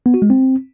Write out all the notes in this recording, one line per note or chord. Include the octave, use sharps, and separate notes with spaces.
B3
F#4
G#3
C4